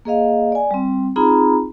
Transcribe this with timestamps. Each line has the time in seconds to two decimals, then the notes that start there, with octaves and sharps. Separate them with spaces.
0.05 A#3 G#4 D#5 F5
0.52 D5 G#5
0.71 G3 C4
1.16 C4 D#4 F4 G#4 A#5 B5